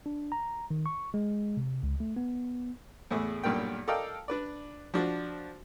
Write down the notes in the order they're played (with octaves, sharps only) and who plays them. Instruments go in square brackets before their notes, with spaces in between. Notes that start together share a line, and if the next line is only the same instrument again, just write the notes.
[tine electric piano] D4
A#5
D#3
C#6
G#3
C3
C#2
A3
B3
[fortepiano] E2 A2 A3 G#4
B1 G2 A#2 A#4 G5
A4 A#4 D5 D#5 F5 G5
D4 B4 D5
F3 D4 F#4